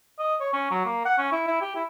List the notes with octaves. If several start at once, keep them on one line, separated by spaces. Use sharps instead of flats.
D#5
C#5
C#4
F#3
A#3
F#5
C#4
E4
E4
G4
E4